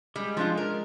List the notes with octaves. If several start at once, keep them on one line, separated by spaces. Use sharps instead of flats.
G3 G#3
F3 D4 F4
A#4